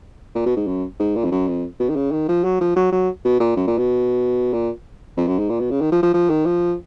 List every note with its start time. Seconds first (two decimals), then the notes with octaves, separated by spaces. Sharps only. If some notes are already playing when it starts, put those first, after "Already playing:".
0.35 A#2
0.46 B2
0.56 G#2
0.67 F#2
1.00 G#2
1.16 A#2
1.24 F2
1.31 F#2
1.48 F2
1.80 B2
1.90 D#3
1.96 C#3
2.12 D#3
2.28 F3
2.44 F#3
2.61 F3
2.76 F#3
2.92 F#3
3.25 B2
3.40 A#2
3.56 F#2
3.67 A#2
3.78 B2
4.53 A#2
5.17 F2
5.27 F#2
5.39 G#2
5.50 A#2
5.60 B2
5.71 C#3
5.81 D#3
5.92 F3
6.03 F3
6.14 F3
6.30 D#3
6.46 F3